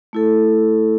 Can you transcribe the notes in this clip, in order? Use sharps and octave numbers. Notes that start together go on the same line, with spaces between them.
A3 E4 A4